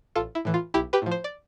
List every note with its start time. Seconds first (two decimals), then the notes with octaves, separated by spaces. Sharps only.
0.16 A1 F4 A4
0.35 E4
0.45 A2 E3
0.54 F4
0.74 B1 E4 G4
0.93 G4 B4
1.02 A2 F3
1.11 C5
1.24 D5